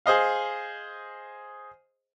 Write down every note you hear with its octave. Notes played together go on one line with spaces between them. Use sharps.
G#4 C5 D#5 F5